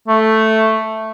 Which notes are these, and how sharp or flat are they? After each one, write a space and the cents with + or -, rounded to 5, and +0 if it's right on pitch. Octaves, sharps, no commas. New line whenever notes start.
A3 +0